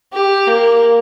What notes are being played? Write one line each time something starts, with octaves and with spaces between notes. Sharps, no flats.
G4
A#3